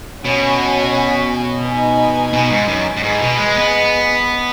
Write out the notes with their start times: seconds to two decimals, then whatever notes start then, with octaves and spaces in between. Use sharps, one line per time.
0.24 B2 C#4 F#4 C#5 G#5
1.64 D#4 B4 D#5 G#5
2.33 B2
2.51 G#2
2.68 F#2
2.97 F#2
3.03 G#2 G#4 B4 D#5
3.21 B2
3.38 G#3
3.56 B3